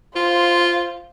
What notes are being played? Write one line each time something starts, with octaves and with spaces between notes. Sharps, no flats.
F4 C5 F5